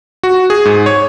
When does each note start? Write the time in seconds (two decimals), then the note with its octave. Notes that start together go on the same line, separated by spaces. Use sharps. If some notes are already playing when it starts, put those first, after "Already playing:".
0.23 F#4
0.50 G#4
0.65 G#2
0.86 C#5